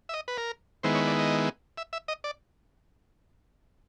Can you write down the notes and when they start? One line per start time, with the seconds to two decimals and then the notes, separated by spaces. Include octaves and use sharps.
0.09 E5
0.14 D#5
0.28 B4
0.38 A#4
0.83 D#3 G#3 B3 E4 C5
0.95 C#5
1.07 D5
1.19 D#5
1.78 E5
1.93 E5
2.08 D#5
2.24 D5